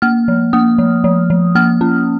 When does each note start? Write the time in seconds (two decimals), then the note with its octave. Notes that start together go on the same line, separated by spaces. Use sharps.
0.02 A#3 F6
0.28 F3
0.53 A#3 D#6
0.78 F3
1.04 F3
1.30 F3
1.55 A#3 F6
1.81 C#4